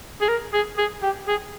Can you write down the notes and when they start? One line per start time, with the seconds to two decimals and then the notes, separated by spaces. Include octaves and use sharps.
0.21 G#4
0.29 A#4
0.54 G#4
0.78 G#4
1.03 G4
1.28 G#4